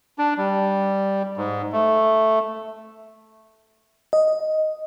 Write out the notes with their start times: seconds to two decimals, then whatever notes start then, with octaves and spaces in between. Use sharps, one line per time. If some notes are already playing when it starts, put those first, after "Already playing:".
0.19 D4
0.38 G3
1.37 G#2
1.72 A3
4.13 D#5